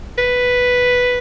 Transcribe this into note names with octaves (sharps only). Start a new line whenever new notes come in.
B4